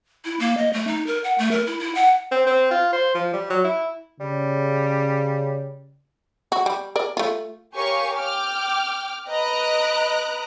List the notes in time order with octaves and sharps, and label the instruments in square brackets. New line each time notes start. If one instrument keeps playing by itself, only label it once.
[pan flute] E4
A#3
D#5
A3
D#4
A#4
F#5
A3
A#4
E4
E4
F#5
[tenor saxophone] C4
C4
F4
C5
F3
G3
F#3
E4
[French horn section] C#3 [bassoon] G3
[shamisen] F#4
G3
A#4 D5
A3 F4
[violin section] G4 A#4 C#5 F5 G#5 C#6
G5 D6 F6
B4 D#5 A#5 F#6 D7